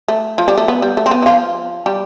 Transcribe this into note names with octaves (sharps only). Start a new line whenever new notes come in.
A3
F3
G3
A3
B3
G3
A3
C4
B3
E4
F3 F4
G3 G4